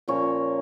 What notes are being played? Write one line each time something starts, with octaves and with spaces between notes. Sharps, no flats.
A#2 F3 A#3 C#4 C#5